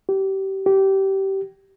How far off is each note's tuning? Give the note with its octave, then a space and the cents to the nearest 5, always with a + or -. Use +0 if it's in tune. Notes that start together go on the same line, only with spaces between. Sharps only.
G4 -25
G4 -20